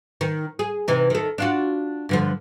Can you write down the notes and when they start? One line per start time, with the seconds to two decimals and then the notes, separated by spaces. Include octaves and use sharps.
0.21 D#3
0.59 G#4
0.88 C3 E3 D#4
1.10 D#3 A4
1.38 D4 F4 F#4
2.09 G2 D3 F3